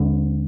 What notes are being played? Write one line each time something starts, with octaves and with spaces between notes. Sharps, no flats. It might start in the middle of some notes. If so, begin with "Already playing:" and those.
Already playing: D#2 D3 G#3 D4